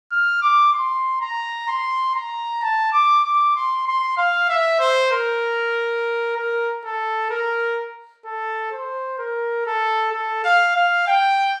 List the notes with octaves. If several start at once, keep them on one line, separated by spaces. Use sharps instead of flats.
F6
D6
C6
A#5
C6
A#5
A5
D6
D6
C6
C6
F5
E5
C5
A#4
A#4
A4
A#4
A4
C5
A#4
A4
A4
F5
F5
G5